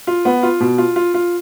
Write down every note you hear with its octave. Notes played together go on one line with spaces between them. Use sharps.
F4
B3
F4
B2
F4
F4
F4